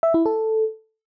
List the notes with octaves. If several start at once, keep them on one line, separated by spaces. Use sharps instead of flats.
E5
E4
A4